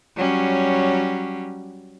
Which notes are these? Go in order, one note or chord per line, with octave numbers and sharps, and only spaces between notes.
F#3 G3 C#4